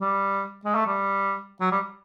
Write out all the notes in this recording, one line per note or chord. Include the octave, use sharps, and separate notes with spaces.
G3
G#3
A3
G3
F#3
G3